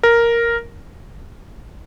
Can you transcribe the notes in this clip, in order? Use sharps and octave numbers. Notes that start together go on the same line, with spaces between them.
A#4